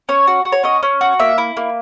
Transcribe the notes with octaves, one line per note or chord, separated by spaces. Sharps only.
C#4 C#5
F#4
F#4
C#5
C#4 D#5
C#4
F#4
A#3 E5
E4
A#3